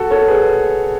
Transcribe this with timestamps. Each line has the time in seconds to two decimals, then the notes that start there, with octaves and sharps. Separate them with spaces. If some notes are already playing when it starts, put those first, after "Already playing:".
Already playing: F#4 A4
0.11 A4 C#5
0.28 G#4 B4